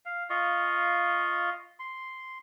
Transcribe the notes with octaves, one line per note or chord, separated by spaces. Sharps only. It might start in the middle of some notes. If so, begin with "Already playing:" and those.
F5
F4 D#5 F5 C#6
C6